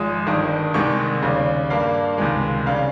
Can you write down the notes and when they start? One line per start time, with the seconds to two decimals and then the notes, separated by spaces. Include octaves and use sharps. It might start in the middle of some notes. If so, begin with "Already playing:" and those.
Already playing: G#1 F3 G#3 D#6
0.27 G1 G2 D#3
0.74 C2 C3 D#3 G#3 C#6
1.22 D#2 C#3 G3
1.70 G2 G3 A#3 F5
2.18 C#2 C3 D#3 G#3
2.66 C#3 G3 F5